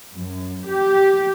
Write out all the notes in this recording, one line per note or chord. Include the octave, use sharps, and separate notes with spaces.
F#2
G4